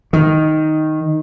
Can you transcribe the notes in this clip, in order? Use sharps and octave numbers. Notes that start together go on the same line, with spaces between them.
D#3